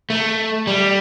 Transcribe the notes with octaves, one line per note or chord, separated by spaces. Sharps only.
A3
G3